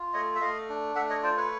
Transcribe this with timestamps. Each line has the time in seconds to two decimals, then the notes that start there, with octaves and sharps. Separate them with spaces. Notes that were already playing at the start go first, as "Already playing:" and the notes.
Already playing: F4
0.13 A3 C#5 D#5
0.36 E5
0.41 A3 D#5 F5
0.69 D4
0.95 A3 E5 F#5
1.10 C#5 D#5
1.23 F4 C5 D5
1.37 B4 C#5